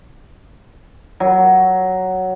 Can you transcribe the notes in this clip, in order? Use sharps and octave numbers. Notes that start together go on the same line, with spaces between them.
F#3